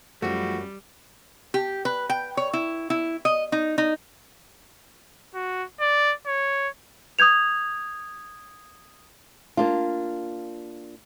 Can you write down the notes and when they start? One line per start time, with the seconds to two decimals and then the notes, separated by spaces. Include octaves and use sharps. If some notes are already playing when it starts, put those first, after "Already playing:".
0.22 F#2 F3 G3 A3 F#4
1.54 G4
1.85 B4
2.09 G5
2.37 C#5
2.53 E4
2.90 E4
3.25 D#5
3.52 D#4
3.78 D#4
5.35 F#4
5.80 D5
6.26 C#5
7.19 D#6 G6 G#6 F7
9.57 A#3 D4 F4